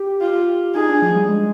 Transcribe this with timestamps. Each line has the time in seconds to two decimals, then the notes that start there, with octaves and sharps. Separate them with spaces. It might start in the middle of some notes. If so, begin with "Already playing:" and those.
Already playing: G4
0.21 F4
0.75 D#4 G#4
0.89 D4
1.02 F3
1.16 G3
1.29 G#3